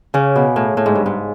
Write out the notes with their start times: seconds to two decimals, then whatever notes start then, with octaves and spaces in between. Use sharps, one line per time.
0.14 C#3 G#4 C#5 F5 G#5
0.36 B2
0.56 A2
0.77 A2
0.86 G#2
0.95 G2
1.06 G#2